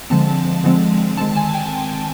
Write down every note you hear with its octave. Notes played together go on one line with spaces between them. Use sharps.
D3 F3 G#3 C4 A5
D3 F3 G#3 C4
D#3 G#3 C4 A5
G#5
G5